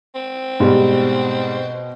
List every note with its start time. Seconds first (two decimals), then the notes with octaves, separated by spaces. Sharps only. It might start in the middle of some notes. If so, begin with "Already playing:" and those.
0.15 C4
0.60 G#2 B2 G3